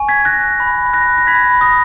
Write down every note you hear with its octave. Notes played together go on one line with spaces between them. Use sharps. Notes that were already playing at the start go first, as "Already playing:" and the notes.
Already playing: G#5 C#6
G#6 B6
F#6 A#6
B5
F#6 A#6
A#6
B5 G#6 B6
D#6 A#6